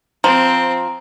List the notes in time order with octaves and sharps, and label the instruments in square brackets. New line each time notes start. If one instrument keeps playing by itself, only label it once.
[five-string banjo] F3 [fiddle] C4 [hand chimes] A#5